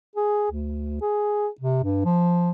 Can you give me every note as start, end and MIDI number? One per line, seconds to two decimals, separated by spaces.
0.16 0.51 68
0.51 0.97 38
1.01 1.47 68
1.61 1.80 48
1.84 2.03 43
2.05 2.51 53